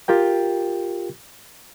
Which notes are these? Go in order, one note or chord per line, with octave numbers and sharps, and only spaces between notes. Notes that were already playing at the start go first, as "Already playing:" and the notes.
F4 G4 A#4 G5